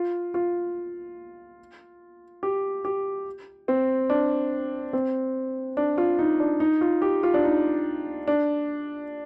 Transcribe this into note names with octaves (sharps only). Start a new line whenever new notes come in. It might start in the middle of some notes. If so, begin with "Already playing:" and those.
Already playing: F4
F4
G4
G4
C4
D4
C4
D4
F4
D#4
D4
D#4
F4
G4
F4
D4
D#4
D4